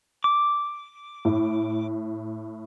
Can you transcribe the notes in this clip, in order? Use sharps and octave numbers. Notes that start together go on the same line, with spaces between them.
D6
A2